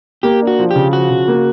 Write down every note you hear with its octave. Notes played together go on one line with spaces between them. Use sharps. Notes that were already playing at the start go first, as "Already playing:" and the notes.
A#3 G4
D4
F#4
F3
C#3 G4
F3 F#4
C#3
A#3